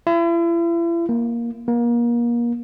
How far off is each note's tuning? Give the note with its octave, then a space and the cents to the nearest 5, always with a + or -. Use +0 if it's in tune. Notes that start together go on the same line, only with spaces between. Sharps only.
E4 +40
A#3 +10
A#3 +30